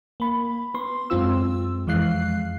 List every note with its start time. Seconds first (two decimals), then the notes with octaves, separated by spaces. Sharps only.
0.20 A#3 B5
0.74 B3 C6
1.10 F#2 G#3 C4 F4 E6
1.87 F2 E3 G#3 F5 F#6 C7